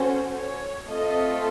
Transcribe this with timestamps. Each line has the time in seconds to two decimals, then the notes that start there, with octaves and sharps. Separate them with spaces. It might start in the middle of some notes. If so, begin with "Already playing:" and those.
Already playing: C#4 F#4 A4 C5
0.37 C#5
0.87 A3 C4 F4 A4 D#5